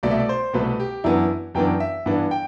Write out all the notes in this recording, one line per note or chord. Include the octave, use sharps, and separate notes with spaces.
C2 B2 A3 D5
E5
D5
C5
C2 B2 A3 B4
G4
F#2 E3 B3 D4 E4
F#2 E3 B3 D4 G5
E5
G2 E3 B3 D4
G5